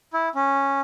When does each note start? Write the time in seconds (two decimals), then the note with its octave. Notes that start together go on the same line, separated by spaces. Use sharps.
0.13 E4
0.35 C#4